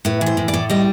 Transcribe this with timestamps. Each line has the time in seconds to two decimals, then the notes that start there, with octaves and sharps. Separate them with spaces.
0.05 A2 B4
0.21 E3
0.26 C5
0.37 A2
0.48 D5
0.54 A2
0.70 G3 D#5